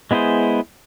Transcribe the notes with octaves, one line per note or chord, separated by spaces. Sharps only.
G#3 B3 E4 G#4 C5